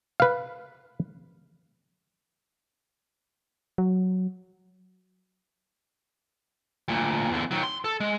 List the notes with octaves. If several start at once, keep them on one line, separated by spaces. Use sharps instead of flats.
B4 F5
F#3
D2 A#2
E2 D3
D#3 F#3
C6
A4
G#3